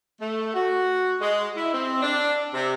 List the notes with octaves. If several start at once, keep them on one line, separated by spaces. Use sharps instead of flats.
A3
F#4
G#3
E4
C4
D4
C3